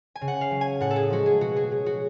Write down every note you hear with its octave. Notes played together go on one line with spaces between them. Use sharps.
G#5
C#3
F#5
F5
F#3
G#5
A2 F#5
A4
G#4
F3 G#3 F#4
G#4
B2 F#4
G#4
F#3 G#4
F#4